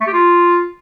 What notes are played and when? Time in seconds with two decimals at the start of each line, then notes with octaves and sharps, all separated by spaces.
0.01 A3
0.07 G4
0.13 F4